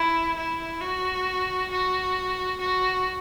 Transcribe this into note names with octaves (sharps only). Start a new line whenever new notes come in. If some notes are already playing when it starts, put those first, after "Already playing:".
Already playing: E4
E4
F#4
F#4
F#4